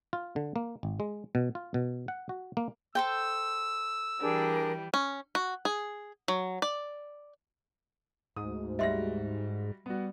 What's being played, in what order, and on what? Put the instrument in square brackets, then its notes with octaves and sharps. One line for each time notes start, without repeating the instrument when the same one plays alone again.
[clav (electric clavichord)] F4
D3
A#3
G#1
G#3
B2
F4
B2
F#5
F#4
A#3
[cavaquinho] A4 C5 G5 [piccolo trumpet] E6
[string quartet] E3 G3 [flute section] D4 G#4 A#4
[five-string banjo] C#4
F#4
G#4
F#3
D5
[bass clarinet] D2 [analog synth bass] G#2 [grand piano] D#6
[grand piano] G3 F#4 A#6 [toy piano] D#5 E5 C6
[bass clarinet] G3 [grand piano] B3 F#4